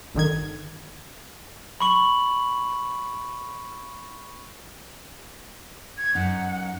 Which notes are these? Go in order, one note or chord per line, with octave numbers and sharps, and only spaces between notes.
G1 D3 D#3 G#6
B5 C#6 F#7
G#6
F#2 D#4 F#5